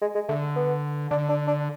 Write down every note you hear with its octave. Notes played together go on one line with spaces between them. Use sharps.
G#3
G#3
D3 A3
B3
D3 D4
D4
D4